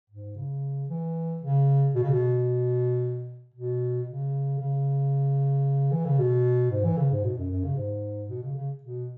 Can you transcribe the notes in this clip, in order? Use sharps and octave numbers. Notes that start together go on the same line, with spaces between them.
G#2
C#3
E3
C#3
B2
C#3
B2
B2
C#3
C#3
E3
C#3
B2
G#2
E3
C#3
G#2
B2
F#2
F#2
C#3
G#2
B2
C#3
C#3
B2